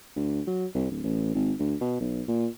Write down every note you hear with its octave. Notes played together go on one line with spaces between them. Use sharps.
D2
F#3
C2
D1
A1
G#1
D2
B2
B1
A#2